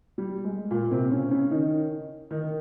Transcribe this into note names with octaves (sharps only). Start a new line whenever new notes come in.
G3
G#3
A#2 A#3
C3 C4
C#3 C#4
C#3 C#4
D#3 D#4
D#3 D#4